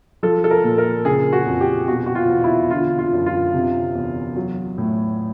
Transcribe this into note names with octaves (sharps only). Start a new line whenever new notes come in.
F3 A4
A4
A#4
A#2
A#4
C#3 G#4
F#4
F2
G4
B2 F#4
F#4
F4
E2
E4
D3 F4
F4
F#2
F4
C3
E2
F#3
A2